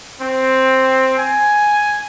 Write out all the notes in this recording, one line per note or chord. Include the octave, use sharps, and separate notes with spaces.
C4
G#5